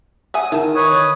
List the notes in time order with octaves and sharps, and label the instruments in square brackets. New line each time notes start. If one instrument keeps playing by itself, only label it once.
[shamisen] E5 F#5 G#5 [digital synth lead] D#6
[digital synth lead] D#3 [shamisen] E4 A5
[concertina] B4 D#6 [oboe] C#5